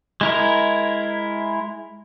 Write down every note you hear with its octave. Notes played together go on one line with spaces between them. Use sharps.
G#3 E4 A#4